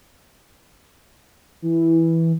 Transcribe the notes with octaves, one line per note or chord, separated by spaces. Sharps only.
E3